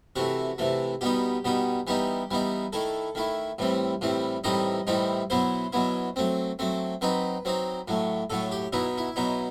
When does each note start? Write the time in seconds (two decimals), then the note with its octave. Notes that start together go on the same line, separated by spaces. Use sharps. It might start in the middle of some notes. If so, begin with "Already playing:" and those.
0.16 C3 E3 A3 F#4
0.58 C3 E3 A3
1.01 B2 G3 B3 D#4 G4
1.45 B2 G3 B3 D#4
1.87 E3 G3 B3 D#4 G4
2.31 E3 G3 B3 D#4
2.73 D#3 A3 E4 A4
3.15 D#3 A3 E4
3.58 A2 E3 G3 C4
4.01 A2 E3 G3 C4
4.44 A2 E3 G3 C4 D#4 D#5
4.87 A2 E3 G3 C4 D#4
5.30 B2 F#3 B3 E4 C5
5.73 B2 F#3 B3 E4
6.16 F#3 A3 C4
6.59 F#3 A3 C4
7.01 F#3 C4 D#4 B4
7.45 F#3 C4 D#4
7.88 A2 F#3 A3
8.30 A2 F#3 A3 A4
8.51 G4
8.73 B2 F#3 B3 D#4 E4
8.98 E4
9.16 B2 F#3 B3 D#4